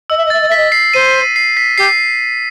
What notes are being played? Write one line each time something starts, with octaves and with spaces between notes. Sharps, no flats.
D#5 E6
E5
D#5
E5 A6
D#5
E5
D#5 B6
C7
C5 D#7
C7
C7
B6
G4 C7